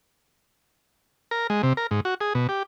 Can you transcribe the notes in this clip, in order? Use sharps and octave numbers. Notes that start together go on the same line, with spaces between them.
A#4
G#3
C3
A#4
G#2
F#4
G#4
B2
G4